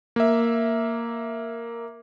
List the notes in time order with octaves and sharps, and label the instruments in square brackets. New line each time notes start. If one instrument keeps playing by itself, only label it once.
[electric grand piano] A#3 E5